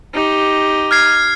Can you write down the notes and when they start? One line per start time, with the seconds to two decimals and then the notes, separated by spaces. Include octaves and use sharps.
0.14 D#4 G4
0.91 F6 G#6 C7